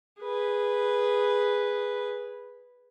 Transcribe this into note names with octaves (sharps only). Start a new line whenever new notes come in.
G#4 B4